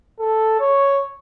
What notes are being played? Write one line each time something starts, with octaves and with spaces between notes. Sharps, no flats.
A4
C#5